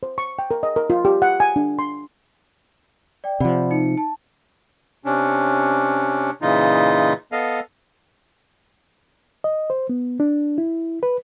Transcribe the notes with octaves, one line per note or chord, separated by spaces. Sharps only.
C5
C#6
G5
A#4
D#5
A#4
F4
G4
F#5
G#5
D4
C6
D5 G5
C3 F3 D5 F#5 B5
D#4 C#7
A5
C3 C#4 D4
A#2 C#3 E3 D#4 F4
B3 A4 D#5 F5
D#5
C5
B3
D4
E4
B4